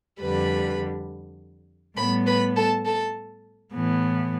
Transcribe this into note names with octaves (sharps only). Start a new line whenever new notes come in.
F2 D3 G3 B4 B5
A2 G3 B3 B4 B5
B4 B5
A4 A5
A4 A5
A2 E3 B3